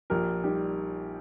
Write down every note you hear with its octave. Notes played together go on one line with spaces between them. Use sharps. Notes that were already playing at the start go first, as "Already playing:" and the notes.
A#1 G4 A#4
G3 D#4 G4